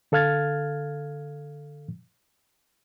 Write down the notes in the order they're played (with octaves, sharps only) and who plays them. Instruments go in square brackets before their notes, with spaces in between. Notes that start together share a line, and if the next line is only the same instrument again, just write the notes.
[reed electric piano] D3 A4 F5 F6 G#6 A6